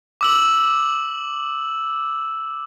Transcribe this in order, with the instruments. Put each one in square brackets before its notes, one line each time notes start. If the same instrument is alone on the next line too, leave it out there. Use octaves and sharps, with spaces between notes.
[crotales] D6 E6 F#7